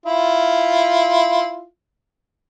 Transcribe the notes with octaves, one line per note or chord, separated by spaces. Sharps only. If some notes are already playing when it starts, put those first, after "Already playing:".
E4 F4